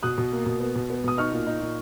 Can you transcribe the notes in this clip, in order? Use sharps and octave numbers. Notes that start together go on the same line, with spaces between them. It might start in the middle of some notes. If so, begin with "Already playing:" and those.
B2 D#6 F#6
B2
A#3
B2
B3
B2
B3
B2 D#6
D#4 C#6 F6
A#2
D#4
A#2